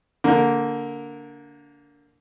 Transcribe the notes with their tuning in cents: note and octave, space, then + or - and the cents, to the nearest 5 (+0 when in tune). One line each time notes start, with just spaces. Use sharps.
D3 -25 A#3 -10